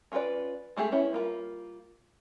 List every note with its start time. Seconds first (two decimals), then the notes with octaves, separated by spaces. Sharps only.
0.12 C#4 F4 G#4 B4 D5
0.76 G#3 A3 G4 G#4
0.92 B3 C#4 E4
1.13 G3 A#3 F4